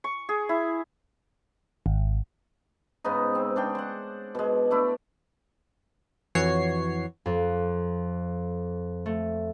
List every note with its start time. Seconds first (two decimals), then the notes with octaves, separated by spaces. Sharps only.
0.04 C#6
0.29 G#4
0.49 E4
1.86 G#1
3.04 G#2 C#3 B3 D#4
3.35 C4
3.56 C#3 D4 G5
3.75 C5 F#5
4.35 B2 G#3
4.71 A3 D4 E4
6.35 F2 E3 F#4 C#5 C7
7.26 F2
9.06 A3